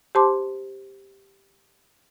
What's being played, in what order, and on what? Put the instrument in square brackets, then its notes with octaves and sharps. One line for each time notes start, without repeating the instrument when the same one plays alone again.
[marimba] G4 C5 A5 C6 D6